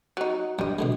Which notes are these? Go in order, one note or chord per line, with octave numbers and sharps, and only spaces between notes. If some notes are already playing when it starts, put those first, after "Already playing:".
F#3 D#4
G2 G3 D#5
B2 D3 G#3